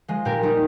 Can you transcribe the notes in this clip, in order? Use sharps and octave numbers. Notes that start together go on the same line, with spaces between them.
F3 G#3
A#2 G4 A#4
G3 D#4 G4